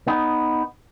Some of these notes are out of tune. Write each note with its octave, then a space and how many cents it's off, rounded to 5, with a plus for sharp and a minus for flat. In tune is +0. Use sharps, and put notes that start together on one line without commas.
B3 +0 D#4 +0